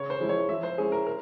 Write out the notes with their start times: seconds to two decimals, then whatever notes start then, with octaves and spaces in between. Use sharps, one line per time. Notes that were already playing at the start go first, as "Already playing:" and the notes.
Already playing: C#3 C#5
0.10 C5
0.20 F3 G#3 E4
0.29 C#5
0.49 F3 E5
0.63 C5
0.78 G#3 C#4 E4 G#4
0.92 A#4
1.06 A#4